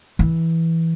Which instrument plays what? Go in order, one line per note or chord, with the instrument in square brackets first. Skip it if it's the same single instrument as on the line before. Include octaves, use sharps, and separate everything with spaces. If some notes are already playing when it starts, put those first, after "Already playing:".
[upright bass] E3